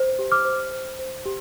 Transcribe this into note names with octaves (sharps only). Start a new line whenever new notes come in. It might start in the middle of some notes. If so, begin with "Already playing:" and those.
Already playing: C5
G4
D6 F6
C5
C5
C5
G4